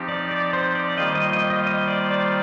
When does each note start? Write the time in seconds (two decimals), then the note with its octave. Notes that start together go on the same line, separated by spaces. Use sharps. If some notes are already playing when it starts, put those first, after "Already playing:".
Already playing: F3 C4 D#4 G4
0.09 D5
0.31 D5
0.53 C5
0.75 D5
0.98 D#3 G3 A#3 F4 C5 D#5
1.15 D#5
1.33 D#5
1.50 D#5
1.67 D#5
1.88 D5
2.11 D5